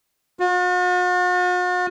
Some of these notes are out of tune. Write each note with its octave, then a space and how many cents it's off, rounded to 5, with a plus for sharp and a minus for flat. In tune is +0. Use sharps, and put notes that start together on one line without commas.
F#4 -45